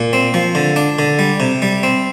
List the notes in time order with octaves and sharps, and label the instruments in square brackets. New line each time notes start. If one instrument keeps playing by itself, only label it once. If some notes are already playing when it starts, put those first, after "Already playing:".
Already playing: [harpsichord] A#2
C4
F3
D3
D4
D3
G3
C3
G3
C4